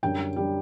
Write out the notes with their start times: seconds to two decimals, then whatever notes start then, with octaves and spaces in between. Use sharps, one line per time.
0.03 F#2 D3 G3 G5
0.36 D3 G3